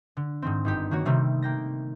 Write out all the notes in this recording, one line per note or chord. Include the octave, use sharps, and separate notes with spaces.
D3
G#2 D#3 C4
G1 D#4 G4
D#3 A#3 F#4 C#5
C3 D#3 G3 A3 C4
A#3 G5 A#6